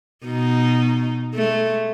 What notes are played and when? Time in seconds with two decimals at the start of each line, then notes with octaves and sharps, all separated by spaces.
0.24 B2 D#4
1.35 G#3 A3